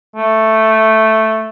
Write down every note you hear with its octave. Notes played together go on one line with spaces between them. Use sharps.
A3